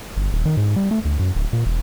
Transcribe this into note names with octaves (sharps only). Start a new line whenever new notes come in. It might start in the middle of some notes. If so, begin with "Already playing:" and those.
G1
D#1
D#3
G#2
G3
A3
D2
F#2
D1
A#2
E1